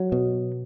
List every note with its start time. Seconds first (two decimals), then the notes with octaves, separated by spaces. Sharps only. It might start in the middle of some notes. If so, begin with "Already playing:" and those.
Already playing: F#3
0.12 B2